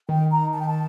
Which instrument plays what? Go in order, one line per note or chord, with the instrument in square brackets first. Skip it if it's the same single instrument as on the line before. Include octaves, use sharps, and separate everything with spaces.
[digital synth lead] D#3 [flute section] G5
[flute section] A#5
A5
G5
A5